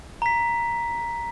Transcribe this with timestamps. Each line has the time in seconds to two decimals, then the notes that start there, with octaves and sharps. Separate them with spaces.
0.22 A#5 B6